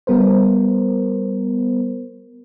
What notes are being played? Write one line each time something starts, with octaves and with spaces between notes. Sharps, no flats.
G3 B3 A#4 C5